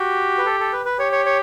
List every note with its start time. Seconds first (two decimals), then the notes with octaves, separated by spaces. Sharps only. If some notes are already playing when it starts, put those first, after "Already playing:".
Already playing: F#4 G4
0.38 B4
0.46 A4
0.60 A4
0.73 B4
0.85 B4
0.99 G4 C#5
1.12 C#5
1.25 C#5